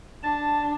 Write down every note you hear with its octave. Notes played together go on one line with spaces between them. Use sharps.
D4 A5